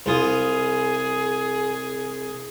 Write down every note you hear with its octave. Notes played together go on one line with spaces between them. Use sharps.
C2 F4 G#4 D#6